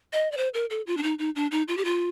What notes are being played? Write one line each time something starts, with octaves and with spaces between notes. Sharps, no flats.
D#5
D5
C5
A#4
A4
F4
D4
D#4
D#4
D4
D#4
F4
G4
F4